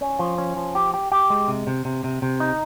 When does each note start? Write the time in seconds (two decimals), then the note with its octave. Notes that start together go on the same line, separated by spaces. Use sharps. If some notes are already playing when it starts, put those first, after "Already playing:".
0.01 C#4
0.19 F3
0.38 C#4
0.56 F3
0.75 G4
0.94 G4
1.12 G4
1.30 G#3
1.48 C3
1.67 C3
1.85 C3
2.04 C3
2.22 C3
2.40 D#4